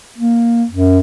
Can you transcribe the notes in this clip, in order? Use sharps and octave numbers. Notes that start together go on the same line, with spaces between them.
A#3
F#2